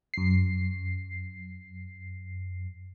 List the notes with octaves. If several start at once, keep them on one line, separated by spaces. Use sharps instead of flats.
F#2 C7